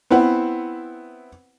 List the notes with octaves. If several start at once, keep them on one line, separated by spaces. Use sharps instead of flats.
B3 C4 E4 B4 F#5